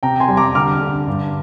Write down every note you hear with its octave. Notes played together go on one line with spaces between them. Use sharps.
C3 G5 A#5
G#5 C6
G3
A#5 D6
D3 D6 F6
D3
G2